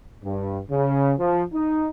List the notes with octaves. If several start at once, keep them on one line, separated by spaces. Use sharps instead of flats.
G2
C#3
F3
D#4